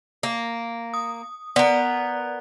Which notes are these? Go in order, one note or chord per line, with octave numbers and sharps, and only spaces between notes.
A#3
D#6
B3 A#4 D5